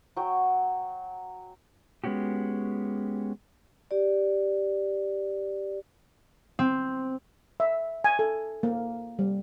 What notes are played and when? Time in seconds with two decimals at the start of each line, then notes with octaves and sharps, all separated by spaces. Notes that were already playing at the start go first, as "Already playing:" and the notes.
0.16 F#3 G5
2.04 G#3 B3 C#4 F#4 G4
3.91 G4 D5
6.59 C4
7.60 E5
8.04 G#5
8.19 A4
8.63 A#3
9.19 G3